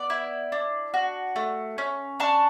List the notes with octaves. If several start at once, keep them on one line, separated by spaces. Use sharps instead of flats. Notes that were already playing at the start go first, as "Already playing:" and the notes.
Already playing: B3 D5
E4
D4
F#4
A3
C#4
D4 A5 C#6